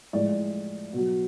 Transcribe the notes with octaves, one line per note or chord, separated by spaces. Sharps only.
A2 F3 G#3 D5
B2 F#3